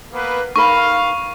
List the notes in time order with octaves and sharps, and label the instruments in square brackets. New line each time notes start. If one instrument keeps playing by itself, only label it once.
[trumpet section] A#3 B3 B4
[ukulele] D#4 A#4 B5 [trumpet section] F5 [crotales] C#6